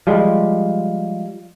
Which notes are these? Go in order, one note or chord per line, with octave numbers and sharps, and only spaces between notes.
F3 G3 G#3